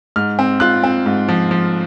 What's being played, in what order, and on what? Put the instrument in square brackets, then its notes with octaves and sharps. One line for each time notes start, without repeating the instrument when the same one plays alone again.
[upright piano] G#2 F6
C4
F4 F#6
C4
G#2
F3
F3